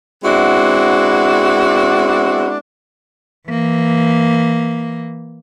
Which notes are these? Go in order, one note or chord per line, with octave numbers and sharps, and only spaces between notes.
G#3 B3 C4 D4 E4 F#4
E3 A#3